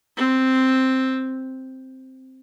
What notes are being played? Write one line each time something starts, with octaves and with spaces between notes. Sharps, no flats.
C4